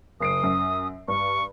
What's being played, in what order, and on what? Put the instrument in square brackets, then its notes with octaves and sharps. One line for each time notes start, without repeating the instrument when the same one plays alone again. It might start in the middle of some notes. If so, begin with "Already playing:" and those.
[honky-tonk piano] F#1 C7 D7 [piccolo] D#6
[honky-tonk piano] F#2
[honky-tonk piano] G2 [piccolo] C#6